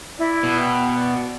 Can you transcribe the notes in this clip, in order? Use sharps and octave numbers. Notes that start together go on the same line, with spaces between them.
E4 D5
B2
F#5 G5
D5 F#5